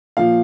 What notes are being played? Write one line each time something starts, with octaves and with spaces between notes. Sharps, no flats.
A#2 F3 F5